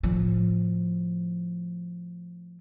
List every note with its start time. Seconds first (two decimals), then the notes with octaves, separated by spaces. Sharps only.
0.03 A2 F3